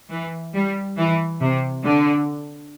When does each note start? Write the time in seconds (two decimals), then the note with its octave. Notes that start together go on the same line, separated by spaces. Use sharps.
0.10 E3
0.54 G3
0.97 E3
1.40 C3
1.84 D3